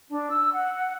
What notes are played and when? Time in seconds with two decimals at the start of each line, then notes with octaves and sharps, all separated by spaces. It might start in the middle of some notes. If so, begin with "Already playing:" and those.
0.09 D4
0.29 E6
0.53 F#5